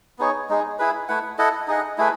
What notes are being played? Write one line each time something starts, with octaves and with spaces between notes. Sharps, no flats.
B3 D#4 G#4 C#5
G#3 D#4 G#4
E4 G#4 B4
A3 E4 B4 F#5
E4 A4 D#5 F#5
D#4 G#4 D#5 F#5
A3 E4 G#4 B4